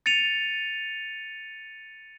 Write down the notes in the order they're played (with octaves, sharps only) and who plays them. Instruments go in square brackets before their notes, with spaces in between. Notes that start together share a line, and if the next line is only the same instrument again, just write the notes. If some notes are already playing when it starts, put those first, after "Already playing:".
[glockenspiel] A6 C#7 D#7 F7